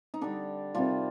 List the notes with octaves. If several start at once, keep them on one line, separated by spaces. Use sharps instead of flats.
D#4
D3 G3 D4
C3 D#3 G3 D4 F4